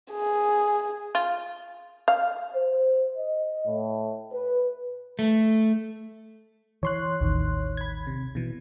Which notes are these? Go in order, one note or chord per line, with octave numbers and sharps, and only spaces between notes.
G#4
F4
F5
C5
D#5
A2
B4
A3
E3 C#5 C6 F#6
A1 D#2 D#3
B5 G#6
C3
B2 E3